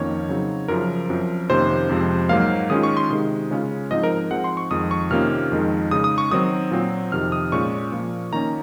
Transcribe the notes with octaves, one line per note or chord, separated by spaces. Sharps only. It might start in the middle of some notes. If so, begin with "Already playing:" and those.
Already playing: F2 D#3 A#3 C#4 C#5
C#3 F#3 C4 D#4
F#2 C#3 F3 A#4
F#2 F3 C4
F2 C3 D#3 A#3 C#4 C5
F2 C3 F3 G#3 C4
G#2 F#3 A#3 F5
D#3 G#3 C#4 F4 D#6
C#6
C6
C3 D#3 G#3
C#3 G#3 C#4 F4
G#2 F3 C4 D#4 D#5
A#4
G#2 F3 G#3 C4 F#5
C6
C#6
F2 D#3 G#3 D#6
C#6
C3 D#3 A#3 C#4 F4 F6
F2 D#3 G#3
C#3 G#3 D#4 D#6
D#6
C#6
D#3 F#3 C4 D#6
A#2 F#3 C4 F4
F2 C3 D#3 F6
D#6
A#2 G#3 C#4 C#6
A#2 F3 A#3
D#3 A#3 C#4 A#5